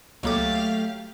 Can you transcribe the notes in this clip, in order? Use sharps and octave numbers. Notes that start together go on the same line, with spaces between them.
C#2 F#3 A3 A#3 G4 F5 D6